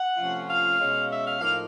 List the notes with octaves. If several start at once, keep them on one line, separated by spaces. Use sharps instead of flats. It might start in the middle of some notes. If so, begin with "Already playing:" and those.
Already playing: F#5
C3 F3 A3 C#4 F4
F5
B2 G#3 C#4
E5
F5
A2 F3 A#3 D#4 F5